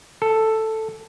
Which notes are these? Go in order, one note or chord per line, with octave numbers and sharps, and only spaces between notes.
A4